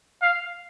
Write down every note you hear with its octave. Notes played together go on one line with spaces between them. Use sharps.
F5